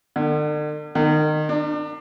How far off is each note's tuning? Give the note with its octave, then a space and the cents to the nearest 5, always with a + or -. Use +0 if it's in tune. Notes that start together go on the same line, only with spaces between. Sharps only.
D3 +45
D#3 -25
D4 +30